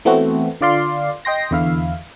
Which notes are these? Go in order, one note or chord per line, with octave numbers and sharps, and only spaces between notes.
E3 A3 B3 C4 F#4
D3 F4 D5 F5 C6
D#5 G5 C6 A#6
E2 D3 E4 E5 F5